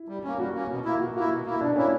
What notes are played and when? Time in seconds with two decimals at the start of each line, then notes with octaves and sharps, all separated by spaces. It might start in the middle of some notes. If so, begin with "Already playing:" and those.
Already playing: E4
0.08 G3
0.24 A#3 C#4
0.39 G3 F#4
0.54 A#3 C#4
0.70 B2
0.85 A#3 E4
1.00 B2 F#4
1.15 A#3 E4 F#4
1.31 B2
1.46 A#3 E4
1.61 B2 D4
1.76 A#3 C#4 E4